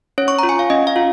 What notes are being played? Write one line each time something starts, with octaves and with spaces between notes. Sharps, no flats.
C#4 C#5
C#6
F4 A#5
G#5
F5
C#4 D#5
F5
F4